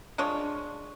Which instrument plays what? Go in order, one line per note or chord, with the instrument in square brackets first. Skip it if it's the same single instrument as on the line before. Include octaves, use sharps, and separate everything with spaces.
[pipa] G#3 D4 F4 C#5